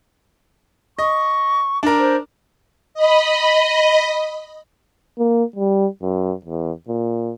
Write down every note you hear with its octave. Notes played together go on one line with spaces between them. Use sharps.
D#5 C#6
D4 A#4
C5
D#5 B5
A#3
G3
F#2
E2
A#2